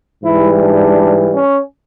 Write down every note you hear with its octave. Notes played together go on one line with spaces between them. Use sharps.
G#2 E3 G3 E4
D4
C#4